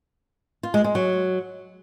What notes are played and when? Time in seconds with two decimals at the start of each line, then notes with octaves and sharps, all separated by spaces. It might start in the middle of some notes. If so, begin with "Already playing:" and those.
0.63 F4
0.74 G#3
0.84 G#3
0.95 F#3